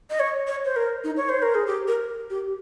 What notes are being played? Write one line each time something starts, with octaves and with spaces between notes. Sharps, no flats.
D#5
C#5
C#5
C5
A#4
D#4
C#5
C5
A#4
G#4
G4
A#4
G4